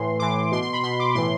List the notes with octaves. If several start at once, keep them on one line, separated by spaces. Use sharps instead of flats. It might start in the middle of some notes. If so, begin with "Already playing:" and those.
Already playing: A2 E3 C6
A2 E3 D6
B2 C6
C6
B5
B2 C6
D6
A2 E3 C6